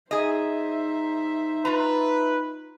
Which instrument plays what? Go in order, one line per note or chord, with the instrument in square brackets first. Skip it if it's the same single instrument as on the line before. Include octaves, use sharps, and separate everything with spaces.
[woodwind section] D#4 [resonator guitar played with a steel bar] G#4 D#5 [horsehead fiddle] C5 E5
[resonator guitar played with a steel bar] F4 A#5 [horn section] B4